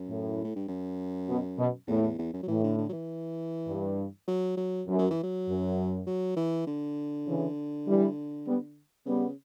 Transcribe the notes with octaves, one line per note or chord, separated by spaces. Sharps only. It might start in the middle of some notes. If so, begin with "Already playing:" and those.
Already playing: F#2
A2
A2
G2
F#2
B2
B2
E2 A2
E2
E2
F#2
F#3
A2 E3
D3
D3
F#3
E3
G2
F#3
F#3
F#2
F#3
E3
F#3
F#2
F#3
E3
D3
C#3 E3
E3 G3
G3 B3
C#3 G3 B3